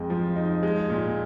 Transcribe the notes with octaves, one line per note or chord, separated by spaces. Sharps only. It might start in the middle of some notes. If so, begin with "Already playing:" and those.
Already playing: F2 G#3
F3
D#4
G#3
A#2